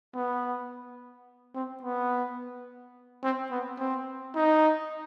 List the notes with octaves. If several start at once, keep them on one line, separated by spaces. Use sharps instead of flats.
B3
C4
B3
C4
B3
C4
D#4